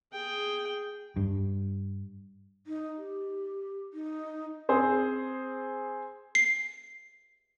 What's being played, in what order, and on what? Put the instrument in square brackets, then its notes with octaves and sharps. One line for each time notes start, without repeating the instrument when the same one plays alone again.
[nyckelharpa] G#4 G5
[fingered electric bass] G2
[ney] D#4
G4
D#4
[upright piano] C4 G#4 C5
[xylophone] C7